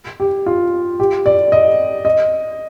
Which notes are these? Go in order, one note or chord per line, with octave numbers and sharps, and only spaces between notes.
G4
F4
G4
D5
D#5
D#5